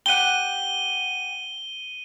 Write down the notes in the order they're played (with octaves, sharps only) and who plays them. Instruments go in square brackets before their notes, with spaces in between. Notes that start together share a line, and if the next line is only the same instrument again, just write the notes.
[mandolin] G4 F#5 [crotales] D#7 G7